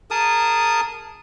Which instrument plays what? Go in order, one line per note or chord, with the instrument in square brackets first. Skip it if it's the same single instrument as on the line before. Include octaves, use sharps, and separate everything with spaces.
[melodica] G#4 A#4 A5 D#6